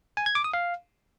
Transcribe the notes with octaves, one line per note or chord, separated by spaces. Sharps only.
G#5
G#6
D6
D#6
F5